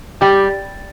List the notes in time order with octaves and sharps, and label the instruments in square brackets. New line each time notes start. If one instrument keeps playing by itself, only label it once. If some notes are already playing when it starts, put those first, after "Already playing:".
[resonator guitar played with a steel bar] G3 [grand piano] G4